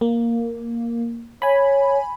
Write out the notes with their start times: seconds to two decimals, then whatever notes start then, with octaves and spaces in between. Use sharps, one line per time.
0.01 A#3
1.42 C#5 G#5 B5